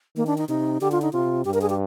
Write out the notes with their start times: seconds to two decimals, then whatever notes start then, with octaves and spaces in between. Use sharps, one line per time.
0.16 D#3 A#3
0.27 D4
0.38 D#4
0.48 C3 D#4
0.81 D3 G4
0.92 F4
1.02 D#4
1.13 C3 F4
1.45 G2 G4
1.54 A#4
1.61 G#4
1.70 G4